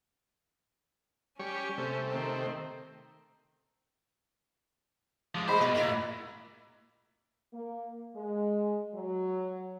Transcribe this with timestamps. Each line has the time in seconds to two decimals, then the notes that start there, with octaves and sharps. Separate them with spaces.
1.39 G3 C#4 G4 C#5
1.78 C3 A3
2.13 D#3 C4
5.35 F3 G#3 D6
5.48 A#2 G3 G#3 C5 D#5 B5 D6
5.61 B2 B4
5.74 D#2 A#2 E4 F#4 A#4
7.54 A#3
8.15 G#3
8.95 F#3